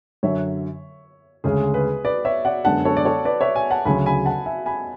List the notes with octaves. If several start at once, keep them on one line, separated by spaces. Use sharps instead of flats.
F#2 D3 F#3 C#5 E5
D2 C#3 G#3 C#4 G#4
G#4 B4
B4 D5
C#5 E5
D5 F#5
F#2 D3 G#3 B3 D4 F#5 A5
A4 C#5
D5
A4 C#5
B4 D5
C#5 E5
E5 G#5
F#5 A5
D2 C#3 F#3 G#5 B5
G#5 B5
F#5 A5
E5 G#5
G#5 B5